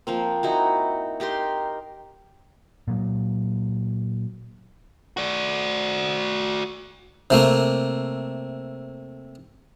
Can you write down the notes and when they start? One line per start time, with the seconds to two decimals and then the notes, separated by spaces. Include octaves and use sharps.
0.07 F3 A#3 C4
0.43 D#4 E4 F#4
1.20 D#4 G4 A#4 C6
2.88 A#2 F#3
5.17 F#4 D5
7.30 C3 A3 A#3